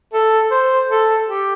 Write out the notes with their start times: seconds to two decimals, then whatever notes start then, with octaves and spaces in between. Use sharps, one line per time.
0.13 A4
0.51 C5
0.89 A4
1.28 G4